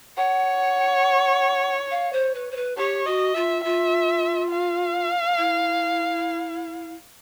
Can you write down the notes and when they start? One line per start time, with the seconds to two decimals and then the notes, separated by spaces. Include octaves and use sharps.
0.17 C#5 F#5
1.90 F5
2.12 C5
2.34 B4
2.51 C5
2.56 B4
2.77 G4 C#5
3.06 F#4 D#5
3.34 F4 E5
3.64 F4 E5
4.51 F5
5.37 E4